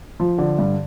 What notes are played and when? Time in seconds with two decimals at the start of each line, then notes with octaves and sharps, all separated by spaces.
0.20 F3
0.38 D3
0.59 G2